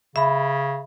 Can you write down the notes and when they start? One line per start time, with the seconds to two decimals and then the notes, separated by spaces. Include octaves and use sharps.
0.16 C#3 E5 B5